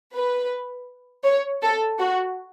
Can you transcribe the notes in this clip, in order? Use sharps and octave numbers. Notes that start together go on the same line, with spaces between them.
B4
C#5
A4
F#4